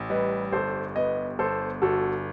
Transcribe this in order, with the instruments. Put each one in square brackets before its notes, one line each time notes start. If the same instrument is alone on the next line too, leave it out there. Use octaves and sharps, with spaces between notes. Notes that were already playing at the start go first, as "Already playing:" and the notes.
Already playing: [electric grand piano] A1
[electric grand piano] G3 [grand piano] B4 D#5
[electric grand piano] G1 [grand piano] A4 C5
[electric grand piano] B3 [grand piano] B4 D#5
[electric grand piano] G1 [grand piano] A4 C5
[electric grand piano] G1 [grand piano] F#4 A4